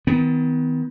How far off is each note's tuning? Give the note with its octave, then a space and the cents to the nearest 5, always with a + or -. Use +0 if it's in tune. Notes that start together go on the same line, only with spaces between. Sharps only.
D#3 +40 B3 +30